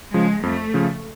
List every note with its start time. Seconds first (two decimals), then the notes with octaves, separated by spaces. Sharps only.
0.13 C#3 F3 G#3
0.43 F2 A3
0.74 C#3 F3